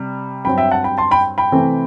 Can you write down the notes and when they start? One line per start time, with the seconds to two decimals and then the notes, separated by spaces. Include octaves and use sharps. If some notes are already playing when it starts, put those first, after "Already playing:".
Already playing: C3 G3
0.45 G2 F#3 C4 G5 B5
0.58 E5 G5
0.71 F#5 A5
0.84 G5 B5
0.98 A5 C6
1.11 G5 B5
1.38 G5 B5
1.52 C3 E3 A3 C4